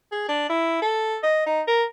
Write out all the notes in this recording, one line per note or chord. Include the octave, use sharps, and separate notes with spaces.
G#4
D4
E4
A4
D#5
D#4
A#4